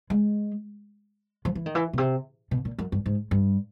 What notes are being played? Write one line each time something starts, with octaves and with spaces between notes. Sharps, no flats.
G#3
F3
E3
D#3
E3
B2
C3
B2
A#2
F#2
G2
G#2
G2